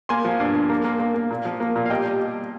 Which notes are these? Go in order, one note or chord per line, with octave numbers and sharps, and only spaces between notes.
A#3 G#5 C6
F3
G2
G2
A#3
A#3
A#3
A#3
A#2
F3
A#3
A#2
F5
G3 D#5 G5
G3
G3